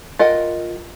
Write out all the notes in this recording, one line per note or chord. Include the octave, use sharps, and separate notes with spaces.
F4 A#4 D#5 F#5 G5